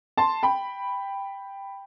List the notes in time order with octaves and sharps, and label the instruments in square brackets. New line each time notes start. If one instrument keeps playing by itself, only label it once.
[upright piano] A5 C6
G5 B5